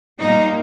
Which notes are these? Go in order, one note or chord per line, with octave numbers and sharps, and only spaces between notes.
A#2 G3 A#3 D#4